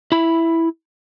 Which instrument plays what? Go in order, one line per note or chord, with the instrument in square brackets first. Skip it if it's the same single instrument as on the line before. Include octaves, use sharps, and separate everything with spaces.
[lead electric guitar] E4 B5